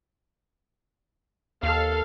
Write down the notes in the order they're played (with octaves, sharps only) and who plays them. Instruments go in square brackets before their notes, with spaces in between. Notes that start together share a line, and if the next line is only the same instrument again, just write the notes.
[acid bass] D#2 [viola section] A4 F5